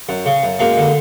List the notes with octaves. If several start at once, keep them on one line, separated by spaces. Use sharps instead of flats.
F#2
C#3
F#2
F#2 G#3 A#3
D3